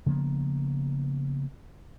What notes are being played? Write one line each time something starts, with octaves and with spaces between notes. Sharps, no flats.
C#3 F3 A#3 B3